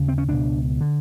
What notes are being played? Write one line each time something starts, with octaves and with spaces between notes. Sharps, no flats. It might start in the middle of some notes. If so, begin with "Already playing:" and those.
Already playing: D#2 C#3
C4
C#4
C#2 B2 D4
D3